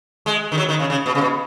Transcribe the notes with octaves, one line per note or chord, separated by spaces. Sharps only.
G#3
D#3
F#3
D#3
C#3
C#3
B2
C#3
B2